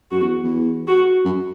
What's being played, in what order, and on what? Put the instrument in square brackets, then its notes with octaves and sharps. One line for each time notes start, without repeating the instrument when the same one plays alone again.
[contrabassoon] F#2 [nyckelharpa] F#4
[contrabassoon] E2
E2
[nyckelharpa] F#4
[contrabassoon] F#2